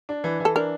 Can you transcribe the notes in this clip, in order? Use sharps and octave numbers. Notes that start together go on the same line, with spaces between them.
D4
E3
E3
A4
D4 A#4